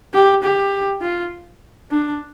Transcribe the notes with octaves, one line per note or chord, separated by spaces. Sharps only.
G4
G4
F4
D4